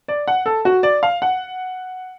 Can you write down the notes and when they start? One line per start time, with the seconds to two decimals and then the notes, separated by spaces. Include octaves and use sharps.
0.08 D5
0.28 F#5
0.46 A4
0.65 F#4
0.83 D5
1.03 F5
1.22 F#5